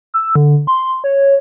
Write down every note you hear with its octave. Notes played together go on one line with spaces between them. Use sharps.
E6
D3
C6
C#5